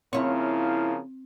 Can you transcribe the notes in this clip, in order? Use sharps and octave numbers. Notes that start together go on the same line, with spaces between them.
C#3 F3 A#3 C4 E4 C#5